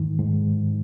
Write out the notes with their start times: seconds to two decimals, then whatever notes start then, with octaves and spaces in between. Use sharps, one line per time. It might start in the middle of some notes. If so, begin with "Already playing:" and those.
Already playing: G#2 D#3
0.19 G#2